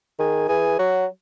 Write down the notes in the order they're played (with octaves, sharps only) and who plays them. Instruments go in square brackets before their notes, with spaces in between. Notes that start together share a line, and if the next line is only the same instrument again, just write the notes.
[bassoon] D#3 [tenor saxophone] G#4
[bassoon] E3 [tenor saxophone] G#4
[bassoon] F#3 [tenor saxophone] F#4